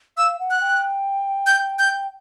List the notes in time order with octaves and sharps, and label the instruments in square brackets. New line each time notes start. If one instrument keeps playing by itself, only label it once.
[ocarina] F5 [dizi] E6
[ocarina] F#5
[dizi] F#6
[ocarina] G5
[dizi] G6
G6